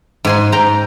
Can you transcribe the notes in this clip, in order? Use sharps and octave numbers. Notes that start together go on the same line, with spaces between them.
G#2 G#5 C6
G#2 G5 A#5